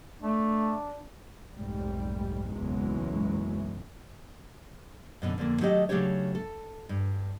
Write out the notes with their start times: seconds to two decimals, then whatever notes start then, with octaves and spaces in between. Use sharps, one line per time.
0.22 A3 D4
1.56 F1 B1 G#2 G3
2.51 F#1 B1 E2 E3 F#3 G#3
5.22 F#2 B2 D3
5.38 F2 D3 A#3
5.61 D#3 F#3 A3 G4 C5 D#5
5.89 C#3 F#3 A3 D4 G4 C#5
6.35 A4
6.89 G2